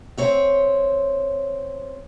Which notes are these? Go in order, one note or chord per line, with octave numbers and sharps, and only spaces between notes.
C4 C#5 E5